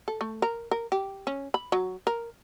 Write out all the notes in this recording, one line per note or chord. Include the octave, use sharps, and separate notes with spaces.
A4
A3
A#4
A#4
G4
C#4
B5
F#3
A#4